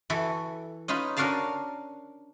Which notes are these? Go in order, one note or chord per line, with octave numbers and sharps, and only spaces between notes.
E3 F#4 A4
C#4 D#4 F4 B4
C#4 D4 F#4 A#4 F5 A5